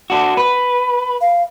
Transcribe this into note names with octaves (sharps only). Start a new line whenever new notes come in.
D4 F#4
B4
F5